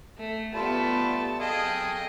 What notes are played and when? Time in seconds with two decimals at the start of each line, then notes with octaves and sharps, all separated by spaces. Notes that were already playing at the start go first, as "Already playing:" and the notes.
0.17 A3
0.54 G3 A3 B3 F4 A5 B5
1.40 G#4 A4 D#5 F5 G5